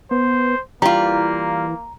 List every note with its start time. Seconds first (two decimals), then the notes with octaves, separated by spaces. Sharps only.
0.11 B3 C5
0.82 E3 G3 A#3 F4 A#5